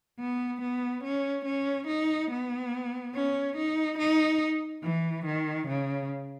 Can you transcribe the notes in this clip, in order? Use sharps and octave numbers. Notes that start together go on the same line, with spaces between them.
B3
B3
C#4
C#4
D#4
B3
C#4
D#4
D#4
E3
D#3
C#3